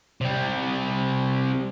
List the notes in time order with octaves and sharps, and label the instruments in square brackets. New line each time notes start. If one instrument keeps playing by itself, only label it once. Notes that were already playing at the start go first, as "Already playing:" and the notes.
[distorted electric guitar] C3 G3